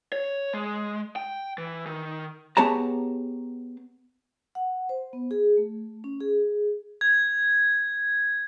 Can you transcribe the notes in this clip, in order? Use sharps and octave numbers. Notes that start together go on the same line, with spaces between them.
C#5
G#3
G5
E3
D#3
B3 G4 G#4 C#5 A5 A#5
F#5
C5
B3
G#4
A3
C#4
G#4
G#6